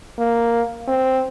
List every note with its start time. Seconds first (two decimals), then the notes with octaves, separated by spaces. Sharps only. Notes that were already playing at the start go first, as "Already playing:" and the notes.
0.18 A#3
0.88 C4